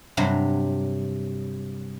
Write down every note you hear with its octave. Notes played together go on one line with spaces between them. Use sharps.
G2 C3 F#3